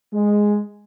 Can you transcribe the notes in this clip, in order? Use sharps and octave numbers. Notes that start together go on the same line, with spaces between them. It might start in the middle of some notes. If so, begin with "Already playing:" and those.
G#3